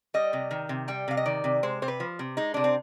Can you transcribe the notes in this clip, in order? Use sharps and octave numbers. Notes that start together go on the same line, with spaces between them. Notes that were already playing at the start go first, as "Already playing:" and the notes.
G3 D#5
C3
D#3
C3
G3 G5
C3 F5
D#5
D#3 D5
C3
G#3 C5
C3 C5
B4
F3
C3
G#3 D#4
C3 D4
C4